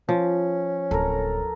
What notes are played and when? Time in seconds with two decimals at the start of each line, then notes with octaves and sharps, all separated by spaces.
0.09 F3 C#4
0.91 D1 A4 A#4